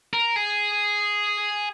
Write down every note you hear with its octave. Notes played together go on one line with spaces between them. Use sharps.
A#4
G#4